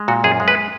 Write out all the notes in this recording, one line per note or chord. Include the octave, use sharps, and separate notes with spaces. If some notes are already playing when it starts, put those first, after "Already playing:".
Already playing: G#3
A#2 F#4
F#2 G#4
G#3
B4